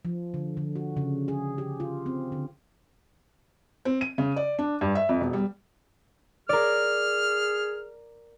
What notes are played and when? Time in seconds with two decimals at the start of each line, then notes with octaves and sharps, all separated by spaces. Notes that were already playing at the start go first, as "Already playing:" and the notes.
0.05 F3
0.34 D3
0.57 D3
0.76 F#4
0.97 C#3
1.28 G#4
1.58 G4
1.80 F4
2.06 C4
2.32 D3
3.85 C4
4.01 D#7
4.18 C#3
4.36 D5
4.59 D4
4.81 G2
4.95 E5
5.09 F2
5.21 E1
5.33 G3
6.49 G#4 A#4 D5 F6